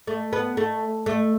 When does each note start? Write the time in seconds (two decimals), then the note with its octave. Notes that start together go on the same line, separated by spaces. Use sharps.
0.07 A3
0.33 B3
0.57 A3
1.06 A3